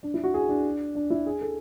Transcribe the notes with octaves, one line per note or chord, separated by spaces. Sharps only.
D4
E4
F#4
G#4
D4
D4
E4
G#4
A4